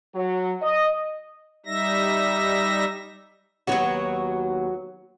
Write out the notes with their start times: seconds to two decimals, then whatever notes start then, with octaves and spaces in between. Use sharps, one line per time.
0.14 F#3
0.61 D#5
1.66 G3 D#4 E5 A#6
3.67 D#2 F#3 B3 F#4 C#5